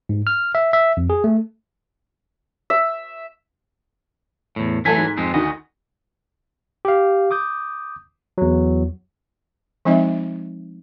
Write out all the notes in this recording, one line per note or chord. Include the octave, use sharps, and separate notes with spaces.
G#2
F6
E5
E5
F2
G#4
A3
E5
E2 A2
E3 F#3 A3 A4 G#5 B6
G#2
F2 G#3 C4
D2 D#3 F#4 D#5
G4 F5
D6 D#6 G6
E2 F#3
F3 G#3 C4 D#4 D#5 E5